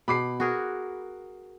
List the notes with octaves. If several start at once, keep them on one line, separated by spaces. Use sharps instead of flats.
B2 B5 D6 C7
F#4 G#4 A#4